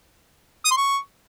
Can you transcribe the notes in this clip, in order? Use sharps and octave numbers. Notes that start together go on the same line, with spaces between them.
D#6
C6
C#6